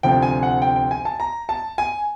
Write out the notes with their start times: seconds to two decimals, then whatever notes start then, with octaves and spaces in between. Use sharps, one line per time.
0.03 D2 C3 F3 G5
0.22 G#5
0.43 F#5
0.62 G5
0.76 G5
0.91 G#5
1.05 A5
1.20 A#5
1.49 A5
1.78 G#5